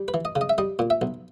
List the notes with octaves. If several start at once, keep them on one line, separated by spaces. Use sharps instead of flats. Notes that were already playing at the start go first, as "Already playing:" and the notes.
Already playing: G3
B4
E3
D#5
C#3
D#5
E5
G3 D#5
A#2
E5
B1